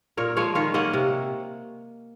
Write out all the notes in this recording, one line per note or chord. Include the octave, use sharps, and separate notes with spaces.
A#2 A#4 C#5
F3 G#3 C#5 F5
D#3 C#5 F5
A#3 C#4 D#5 F#5
C3